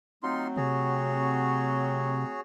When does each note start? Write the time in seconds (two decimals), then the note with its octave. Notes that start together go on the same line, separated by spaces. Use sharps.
0.23 F#3 A3 C4 D#4 F4 C6
0.57 C3 F#4 G#4 C#5